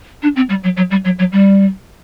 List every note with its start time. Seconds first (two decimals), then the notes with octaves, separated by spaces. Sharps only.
0.22 D4
0.36 C4
0.49 G3
0.63 F#3
0.77 F#3
0.91 G3
1.05 F#3
1.19 F#3
1.32 G3